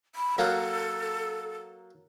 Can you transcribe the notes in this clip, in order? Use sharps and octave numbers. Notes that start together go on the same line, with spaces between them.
B5
F#3 A#3 A4